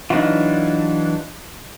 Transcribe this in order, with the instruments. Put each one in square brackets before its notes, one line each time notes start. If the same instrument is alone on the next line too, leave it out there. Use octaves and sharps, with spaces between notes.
[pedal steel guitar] E3 F#3 D4 [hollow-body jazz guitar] D#4 F4